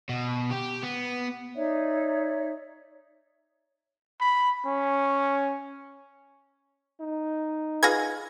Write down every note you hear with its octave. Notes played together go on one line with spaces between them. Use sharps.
B2
G4
B3
D#4 C#5 D5 E5
B5
C#4
D#4
F4 G#4 B4 G#6 A#6